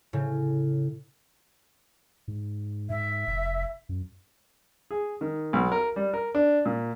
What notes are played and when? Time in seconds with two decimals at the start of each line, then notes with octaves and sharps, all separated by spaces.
0.13 A2 C#3
2.28 G#2
2.90 G#2 E5
3.27 F1
3.89 F#2
4.91 G#4
5.21 D#3
5.53 B1
5.72 A#4
5.96 G3
6.14 A#4
6.35 D4
6.65 A#2